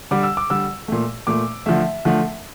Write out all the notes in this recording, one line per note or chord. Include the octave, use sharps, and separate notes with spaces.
D3 G3 D6
E6
D6
D3 G3 E6
A#2 A3
A#2 A3 D6
D3 F3 A3 E5
D3 F3 A3